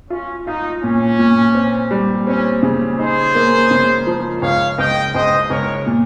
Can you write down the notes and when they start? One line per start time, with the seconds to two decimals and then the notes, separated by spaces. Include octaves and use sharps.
0.10 C#4 F4
0.47 D#4 F4
0.83 A#2 C#4
1.19 A#2
1.55 C4
1.91 G3
2.26 C4 C#4
2.63 C#3
2.98 D#4 G#4 C5
3.35 A#3
3.71 C#3
4.07 F3
4.42 C#2 C#5 F5
4.78 C#2 D#5 G5
5.15 C#2 C5 D#5
5.50 C#2 A#4 C#5
5.86 A#2